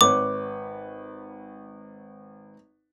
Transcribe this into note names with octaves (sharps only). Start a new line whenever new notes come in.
G#1 B4 C#5 D6